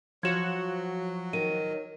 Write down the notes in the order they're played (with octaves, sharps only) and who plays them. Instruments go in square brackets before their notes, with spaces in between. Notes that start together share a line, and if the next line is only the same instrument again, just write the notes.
[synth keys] F3 F#4 [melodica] F#3 [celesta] G#6 E7
[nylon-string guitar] D#3 [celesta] D#7